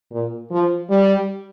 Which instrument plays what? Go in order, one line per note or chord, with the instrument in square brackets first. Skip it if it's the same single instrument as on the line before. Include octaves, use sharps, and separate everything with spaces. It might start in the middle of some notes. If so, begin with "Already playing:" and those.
[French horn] A#2
F3
G3